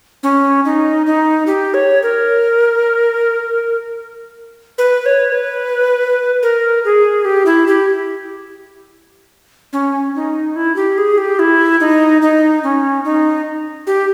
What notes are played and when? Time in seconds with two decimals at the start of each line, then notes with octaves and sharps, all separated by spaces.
0.23 C#4
0.65 D#4
1.06 D#4
1.47 G4
1.74 C#5
2.03 A#4
4.78 B4
5.06 C#5
5.32 B4
6.43 A#4
6.85 G#4
7.25 G4
7.46 E4
7.67 G4
9.73 C#4
10.15 D#4
10.56 E4
10.76 G4
10.98 G#4
11.18 G4
11.39 E4
11.80 D#4
12.22 D#4
12.63 C#4
13.05 D#4
13.87 G4